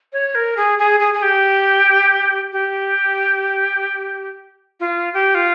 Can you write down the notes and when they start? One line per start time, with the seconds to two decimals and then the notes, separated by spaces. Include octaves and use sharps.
0.13 C#5
0.35 A#4
0.57 G#4
0.79 G#4
1.00 G#4
1.14 G#4
1.22 G4
2.53 G4
4.80 F4
5.14 G4
5.35 F4